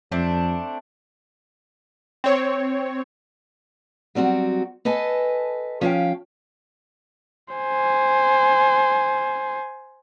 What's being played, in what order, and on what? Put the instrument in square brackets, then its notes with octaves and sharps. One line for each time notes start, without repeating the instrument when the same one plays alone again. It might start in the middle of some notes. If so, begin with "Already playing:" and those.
[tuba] F2 [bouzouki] A3 C4 D4
[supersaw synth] C4 C#5
[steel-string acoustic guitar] F#3 G3 C4 F#4
A4 B4 D#5 G#5 A5
F3 C#4 D#5 F5 G5
[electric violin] C5 G#5